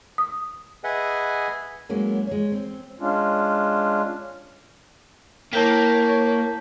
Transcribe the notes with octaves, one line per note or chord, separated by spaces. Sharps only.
D#6
G#4 B4 D#5 E5 F#5 G#5
F#3 G#3 A#3 B3 C#4
G#3 C#5
C4
G#3 C#4 D4 F4
A#3 E4 A#4 C#5 G5 A5 G6 B6